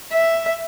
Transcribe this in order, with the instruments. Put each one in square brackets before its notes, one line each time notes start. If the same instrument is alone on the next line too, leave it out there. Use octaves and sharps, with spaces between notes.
[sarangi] E5